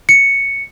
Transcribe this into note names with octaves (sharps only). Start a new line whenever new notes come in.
C#7